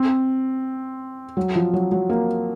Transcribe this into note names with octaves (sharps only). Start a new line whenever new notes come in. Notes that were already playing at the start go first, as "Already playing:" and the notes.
Already playing: C4
F#3
F3
F#3
F#3
A#3